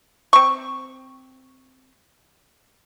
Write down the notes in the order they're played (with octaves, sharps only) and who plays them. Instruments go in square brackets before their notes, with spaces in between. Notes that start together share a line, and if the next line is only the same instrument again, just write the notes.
[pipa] C4 C#6